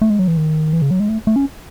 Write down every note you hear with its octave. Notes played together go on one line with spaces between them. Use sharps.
A3
G#3
F#3
E3
D#3
E3
C#3
F#3
G#3
A3
A3
C#4